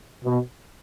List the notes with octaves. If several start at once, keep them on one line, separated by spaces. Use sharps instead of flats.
B2